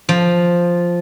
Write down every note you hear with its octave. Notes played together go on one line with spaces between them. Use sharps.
F3